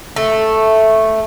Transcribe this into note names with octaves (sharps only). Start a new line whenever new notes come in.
A3